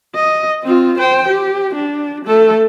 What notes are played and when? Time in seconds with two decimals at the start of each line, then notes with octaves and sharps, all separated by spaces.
0.15 D#5
0.63 C4 F4
0.98 C5 G5
1.28 G4
1.75 D4
2.25 A3 A4